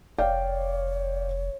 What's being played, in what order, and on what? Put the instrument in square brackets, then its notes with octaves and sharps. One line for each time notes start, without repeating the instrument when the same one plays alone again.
[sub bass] F1 [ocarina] C#5 [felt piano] D5 F5 G5